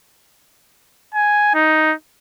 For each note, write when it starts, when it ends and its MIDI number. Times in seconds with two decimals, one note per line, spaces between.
1.14 1.54 80
1.55 1.94 63